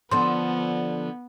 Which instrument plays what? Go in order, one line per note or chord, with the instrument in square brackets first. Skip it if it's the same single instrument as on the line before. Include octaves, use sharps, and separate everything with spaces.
[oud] D3 F3 [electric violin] B3 [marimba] C6